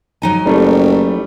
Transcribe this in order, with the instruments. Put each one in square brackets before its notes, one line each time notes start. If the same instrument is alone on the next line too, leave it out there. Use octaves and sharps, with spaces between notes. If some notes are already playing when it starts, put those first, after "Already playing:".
[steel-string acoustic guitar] F#3 D#4 G#5
[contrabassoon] F#1 [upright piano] G3 A3